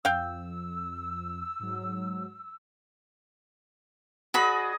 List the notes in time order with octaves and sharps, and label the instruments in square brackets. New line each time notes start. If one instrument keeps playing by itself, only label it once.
[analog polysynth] F2 [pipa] F5 G5 [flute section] E6
[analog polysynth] G#2 F#3
[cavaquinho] F#4 B5 [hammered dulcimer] G#4 D5 D#5